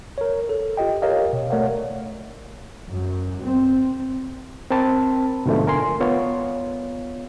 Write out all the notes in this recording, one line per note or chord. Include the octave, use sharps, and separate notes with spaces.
A#4 C#5
A4
F4 G4 D#5 G5
G4 A#4 C#5 D#5 F5
B2
A3 A#4 C#5 D5 F5 F#5
F#2
C4
C4 A#4 A5 B5
G#2 B2 D3 F3 G#3 A3
A#4 G#5 C6
B3 F4 C#5